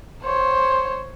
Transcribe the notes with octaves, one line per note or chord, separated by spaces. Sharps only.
C5 C#5